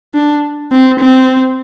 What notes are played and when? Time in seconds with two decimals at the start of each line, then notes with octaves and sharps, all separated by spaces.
0.15 D4
0.72 C4
1.00 C4